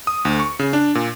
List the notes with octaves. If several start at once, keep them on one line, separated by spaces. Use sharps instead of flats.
D#6
D2
C#6
C#3
D4
A#2